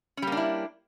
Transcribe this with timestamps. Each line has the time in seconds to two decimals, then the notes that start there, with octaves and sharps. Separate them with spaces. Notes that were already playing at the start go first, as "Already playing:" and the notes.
0.17 C#4
0.22 G3
0.27 A#3
0.32 D4
0.37 E4